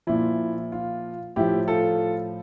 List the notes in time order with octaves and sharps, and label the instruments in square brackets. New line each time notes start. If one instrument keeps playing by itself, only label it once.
[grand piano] A#2 F3 E4
F4
A2 F3 E4 G4
F4 A4